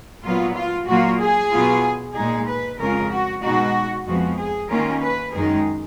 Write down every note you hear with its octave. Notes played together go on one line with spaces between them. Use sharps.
A#2 F#3 B3 F4
F4
A#2 F#3 A#3 F4 F#4
G#4
B2 F#3 B3 F4
A#2 G#3 D#4 G#4
B4
F2 C#3 G#3 C#4 F4 A#4
F#4
B2 G#3 D#4 F#4
F2 F3 G#3 B3 F#4
G#4
D#3 A#3 C#4 F4 A#4
B4
F#2 D#3 G#3 D#4 G#4